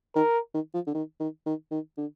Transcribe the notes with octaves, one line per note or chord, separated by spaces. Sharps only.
D#3 A#4
D#3
F3
D3
D#3
D#3
D#3
D#3
D3